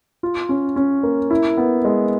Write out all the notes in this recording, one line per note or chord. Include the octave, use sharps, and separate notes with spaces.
F4
C#4
C#4
A#3
E4
B3
G#3